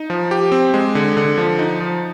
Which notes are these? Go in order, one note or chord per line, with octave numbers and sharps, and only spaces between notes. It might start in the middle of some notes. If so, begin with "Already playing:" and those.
Already playing: D#4
F3
G4
C4
G#3
D3
D3
F3
D#4
F3